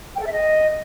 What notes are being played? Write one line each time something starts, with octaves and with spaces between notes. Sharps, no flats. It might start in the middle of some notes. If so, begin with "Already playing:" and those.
G5
A4
E5
D#5